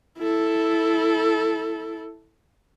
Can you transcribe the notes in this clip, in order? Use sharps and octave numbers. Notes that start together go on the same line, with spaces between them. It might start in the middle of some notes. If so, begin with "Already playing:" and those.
E4 A4